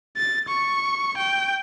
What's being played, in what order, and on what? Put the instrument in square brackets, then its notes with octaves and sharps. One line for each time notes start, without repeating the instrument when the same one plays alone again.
[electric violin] A6
C#6
G5